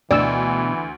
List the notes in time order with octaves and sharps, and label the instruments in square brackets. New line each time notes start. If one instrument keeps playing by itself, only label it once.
[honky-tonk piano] D2 [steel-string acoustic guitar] B2 D4 G5 [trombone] E3 [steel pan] D5 E6